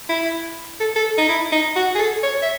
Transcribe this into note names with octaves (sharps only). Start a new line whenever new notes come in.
E4
A4
A4
D#4
E4
D#4
F#4
G#4
A4
C#5
E5